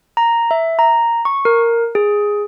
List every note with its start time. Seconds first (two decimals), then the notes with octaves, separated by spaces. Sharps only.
0.17 A#5
0.51 E5
0.79 A#5
1.25 C#6
1.45 A#4
1.95 G#4